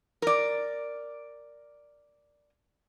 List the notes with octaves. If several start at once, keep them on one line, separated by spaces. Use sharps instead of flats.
A#4 D5